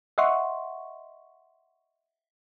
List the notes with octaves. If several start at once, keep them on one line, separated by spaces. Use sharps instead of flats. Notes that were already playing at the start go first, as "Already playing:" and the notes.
D#5 E5 F#5 C6 C#6